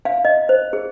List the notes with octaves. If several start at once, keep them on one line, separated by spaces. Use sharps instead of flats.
F5
D#5
C5
G#4